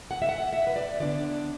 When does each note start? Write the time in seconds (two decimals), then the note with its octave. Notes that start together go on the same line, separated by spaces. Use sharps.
0.11 F#5
0.22 E5
0.29 F#5
0.53 E5
0.67 B4
0.76 D5
1.00 D3 B3 D4 D5